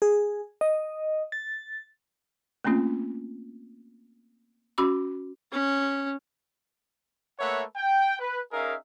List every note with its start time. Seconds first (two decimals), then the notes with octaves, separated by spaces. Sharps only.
0.02 G#4
0.61 D#5
1.32 A6
2.64 A3 A#3 C4 C#4 F4
4.78 C#4 F#4 B5 D6
5.52 C#4
7.39 A3 A#3 B4 C#5 E5 F#5
7.76 G5
8.20 B4
8.52 C#4 D#4 G#4 A#4 E5 F5